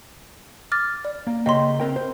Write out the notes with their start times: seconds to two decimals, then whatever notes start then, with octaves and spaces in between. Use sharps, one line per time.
0.72 D6 F6 A6
1.05 D5
1.27 A#3
1.46 C#3 A#3 D#5 G5 C6
1.80 C4 A#4 G5
1.96 C5